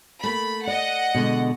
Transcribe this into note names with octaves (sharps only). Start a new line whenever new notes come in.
A3 A#3 B5
D5 D#5 F#5
B2 D3 G#3